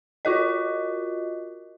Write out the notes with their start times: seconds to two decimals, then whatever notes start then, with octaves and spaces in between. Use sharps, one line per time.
0.25 F4 F#4 A#4 D#5